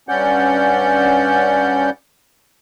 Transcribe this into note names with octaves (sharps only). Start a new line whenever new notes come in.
G2 C#4 D5 F#5 G6